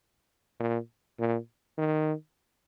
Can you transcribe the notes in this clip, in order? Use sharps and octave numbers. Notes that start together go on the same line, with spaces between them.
A#2
A#2
D#3